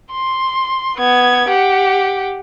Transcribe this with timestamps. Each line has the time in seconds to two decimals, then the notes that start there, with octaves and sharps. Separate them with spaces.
0.12 C6
0.97 B3 G#6
1.49 G4 F#5